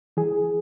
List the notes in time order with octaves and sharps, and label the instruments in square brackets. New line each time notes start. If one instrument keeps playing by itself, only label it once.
[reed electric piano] E3 G#4